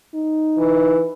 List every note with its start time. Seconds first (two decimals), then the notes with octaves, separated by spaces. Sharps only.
0.15 D#4
0.58 E3